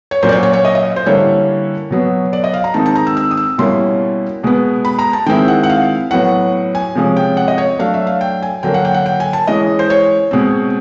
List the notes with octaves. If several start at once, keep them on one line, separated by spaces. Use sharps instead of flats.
C#5
A#2 F#3 A#3 C#4 C5
D5
C#5
C#5
C#5
D#5
D#5
C5
D3 G3 A#3 C#4 E4 C#5
B2 F#3 B3
D5
D#5
F5
A#5
D#3 G#3 C4 D#4 A5
A5
A#5
E6
E6
D#6
E6
B2 G3 A#3 C#4 E4 C6
B2 G#3 B3
B5
A#5
A5
D#3 G#3 C4 E4 G5
F#5
F#5
F5
A2 F#3 B3 F#5
G#5
C3 F3 G#3 C#4
G5
F#5
D#5
C#5
F#3 A3 D4 F5
E5
F5
G5
G#5
D3 F#3 A#3 G5
F#5
G5
F#5
G5
G#5
A5
E3 G#3 C#4 D#5
C5
C#5
B2 G#3 C4